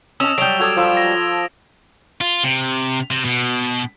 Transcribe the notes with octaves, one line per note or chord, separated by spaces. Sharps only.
C#4 D#5 A5 E6 E7 F7
F#3 G3 D#6 D7 F7 G7
F#4 A4 D5 D#6 G#6 F7
F3 A4 B5
A#6
F4
C3
C3
B2